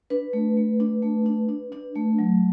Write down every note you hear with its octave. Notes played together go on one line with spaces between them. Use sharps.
D4 B4
A3
A3
D4
A3
D4
D4
D4
A3
F#3